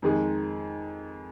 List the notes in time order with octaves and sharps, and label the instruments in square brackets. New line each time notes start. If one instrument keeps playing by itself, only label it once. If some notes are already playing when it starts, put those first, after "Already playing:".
[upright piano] F2 D#3 G#3 D#4 G#4